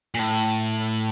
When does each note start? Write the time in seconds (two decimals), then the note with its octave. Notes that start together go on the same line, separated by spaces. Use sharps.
0.14 A#2
0.19 A2